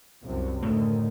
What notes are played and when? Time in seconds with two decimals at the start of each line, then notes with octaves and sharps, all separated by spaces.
0.25 C2 F#2 C3
0.63 D2 A2 D#3 A3